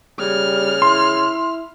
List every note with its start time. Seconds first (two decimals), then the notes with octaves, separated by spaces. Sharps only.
0.19 C#3 G3 F6
0.82 E4 C6